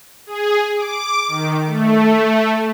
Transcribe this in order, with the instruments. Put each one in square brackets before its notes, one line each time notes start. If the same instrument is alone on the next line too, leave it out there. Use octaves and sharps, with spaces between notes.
[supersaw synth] G#4
D6
D#3
A3